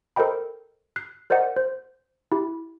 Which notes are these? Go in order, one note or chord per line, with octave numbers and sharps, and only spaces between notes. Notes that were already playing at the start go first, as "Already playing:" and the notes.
A4 A#4 C5 D#5 G5 B5
F#6 C7
A#4 C5 D5 D#5 F#5
C5
E4 G4